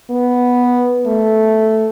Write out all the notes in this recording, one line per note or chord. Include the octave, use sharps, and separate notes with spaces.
B3
A3